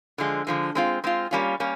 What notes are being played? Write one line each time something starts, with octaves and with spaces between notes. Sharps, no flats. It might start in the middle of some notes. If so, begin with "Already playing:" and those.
D3 F3 G#3
D3 F3 G#3
G#3 C4 F4
G#3 C4 F4
G3 A#3 C#4 F4
G3 A#3 C#4